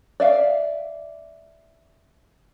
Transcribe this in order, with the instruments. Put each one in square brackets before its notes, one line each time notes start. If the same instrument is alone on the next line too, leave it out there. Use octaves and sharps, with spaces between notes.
[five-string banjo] D5 E5 F5